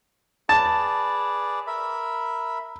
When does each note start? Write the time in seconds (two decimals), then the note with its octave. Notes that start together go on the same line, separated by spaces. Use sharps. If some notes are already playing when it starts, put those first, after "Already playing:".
0.49 G#4 B4 D5 A5
1.67 A#4 E5 B5